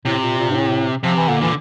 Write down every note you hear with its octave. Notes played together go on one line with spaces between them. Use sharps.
A2 C3
A#2
A#2
G2
A2
C3 F3
E3
A#2 D3
D3 E3